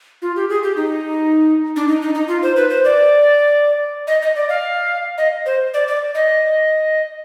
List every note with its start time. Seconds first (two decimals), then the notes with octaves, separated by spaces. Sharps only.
0.22 F4
0.36 G4
0.50 G#4
0.63 G4
0.76 D#4
1.76 D4
1.88 D#4
2.02 D#4
2.15 D#4
2.28 F4
2.43 C5
2.56 B4
2.70 C5
2.84 D5
4.07 D#5
4.22 D#5
4.35 D5
4.49 F5
5.18 D#5
5.46 C5
5.74 D5
5.88 D5
6.15 D#5